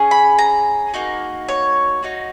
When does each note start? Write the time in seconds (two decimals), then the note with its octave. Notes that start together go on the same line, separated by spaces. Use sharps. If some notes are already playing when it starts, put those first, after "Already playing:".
Already playing: C#4 G#4
0.11 B5
0.39 A#5
0.94 A#3 D#4 F#4
1.48 C#5
2.03 A#3 D#4 F#4